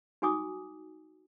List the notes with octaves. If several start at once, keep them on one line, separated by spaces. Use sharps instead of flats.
D#4 F#4 G#5 D6 D#6